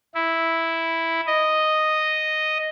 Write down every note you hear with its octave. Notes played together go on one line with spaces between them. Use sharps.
E4
D#5